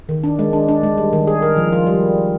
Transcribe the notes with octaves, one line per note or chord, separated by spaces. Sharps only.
D#3
D4
G#3
D4
D4
G#3
G3
D#3
G#4
A#4
F3
F4
G3